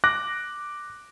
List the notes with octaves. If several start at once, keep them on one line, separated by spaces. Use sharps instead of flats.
D6 F#6 A#6